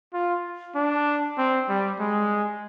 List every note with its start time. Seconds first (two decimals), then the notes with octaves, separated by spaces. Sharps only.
0.13 F4
0.75 D4
1.38 C4
1.69 G3
2.00 G#3